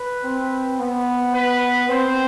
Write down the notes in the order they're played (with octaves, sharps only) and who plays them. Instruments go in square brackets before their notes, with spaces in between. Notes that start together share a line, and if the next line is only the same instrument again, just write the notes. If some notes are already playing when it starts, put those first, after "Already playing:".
Already playing: [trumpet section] B4
[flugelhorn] C4
B3
[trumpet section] B4
[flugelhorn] C4 [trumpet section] C5